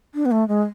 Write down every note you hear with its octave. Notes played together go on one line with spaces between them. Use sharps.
D4
B3
A3
G#3